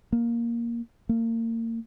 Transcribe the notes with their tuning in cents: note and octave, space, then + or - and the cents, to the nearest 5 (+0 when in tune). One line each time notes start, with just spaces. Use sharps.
A#3 +5
A#3 -35